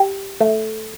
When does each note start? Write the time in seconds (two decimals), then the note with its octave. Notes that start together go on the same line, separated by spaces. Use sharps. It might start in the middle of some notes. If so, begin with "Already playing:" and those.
Already playing: G4
0.40 A3